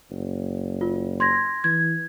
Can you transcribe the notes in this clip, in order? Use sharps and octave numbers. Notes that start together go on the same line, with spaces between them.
F#1
F4
C6 G#6 A#6
E3 G#6